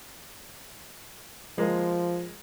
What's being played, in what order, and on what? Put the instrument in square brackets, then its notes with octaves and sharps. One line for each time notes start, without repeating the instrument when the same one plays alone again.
[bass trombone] F3 [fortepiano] G#3 A#3